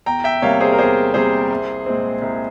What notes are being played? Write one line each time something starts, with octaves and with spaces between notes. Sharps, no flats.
E2 G5 A#5
E5 G5
C3 G3 A#3 C#5 F5
G#4 C5
A#4
E2 G#4 C5
C3 G3 A#3 G#4 C5
C2
A#2 G#3 C4
C2